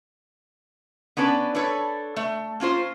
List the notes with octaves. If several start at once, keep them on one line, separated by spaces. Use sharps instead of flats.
B3 C#4 D4 B4
D4 A4 B4 C#5
A3
A#3 C#4 F4 C5